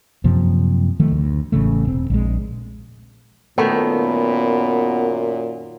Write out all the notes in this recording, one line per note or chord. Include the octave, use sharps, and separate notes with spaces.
F#2 C3 F3 A#3
D#3 F3 A3
D2
A1 C#3 A3
E1 C4
A#1 G#3
F#2 A#2 D#3 A3 B3